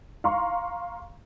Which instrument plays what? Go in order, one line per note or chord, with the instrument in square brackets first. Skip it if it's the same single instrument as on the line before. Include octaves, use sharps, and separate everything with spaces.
[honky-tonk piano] F5 A#5 C6 C#6